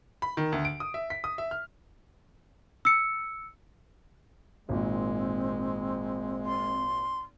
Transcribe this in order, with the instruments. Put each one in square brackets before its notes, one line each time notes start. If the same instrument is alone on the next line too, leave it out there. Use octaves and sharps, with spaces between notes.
[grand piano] B5
D#3
D2
D7
D#6
E5
B6
D#6
E5
F6
[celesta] E6 C#7
[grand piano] G#1 A#2 [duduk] G#3 [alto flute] C4
[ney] C6